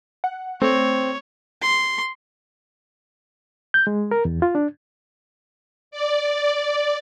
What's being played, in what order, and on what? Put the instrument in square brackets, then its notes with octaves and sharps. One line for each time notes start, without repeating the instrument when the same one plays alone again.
[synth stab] F#5
[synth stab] A3 [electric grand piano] C4 [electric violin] C#5
[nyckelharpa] C6
[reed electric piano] G6
G#3
A#4
E2
F4
D4
[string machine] D5